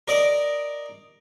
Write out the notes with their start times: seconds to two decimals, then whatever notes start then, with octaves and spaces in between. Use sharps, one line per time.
0.08 A#4 D5 D#5